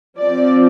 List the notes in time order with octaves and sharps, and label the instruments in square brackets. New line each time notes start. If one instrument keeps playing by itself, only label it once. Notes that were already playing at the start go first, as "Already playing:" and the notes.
[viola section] F3 C4 D5